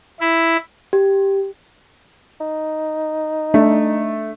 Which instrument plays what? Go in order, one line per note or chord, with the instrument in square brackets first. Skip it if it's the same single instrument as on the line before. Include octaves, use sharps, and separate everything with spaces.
[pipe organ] E4
[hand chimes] G4
[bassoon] D#4
[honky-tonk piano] A3 [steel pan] D4